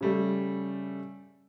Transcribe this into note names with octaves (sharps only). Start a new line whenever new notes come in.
C#3 G3 A3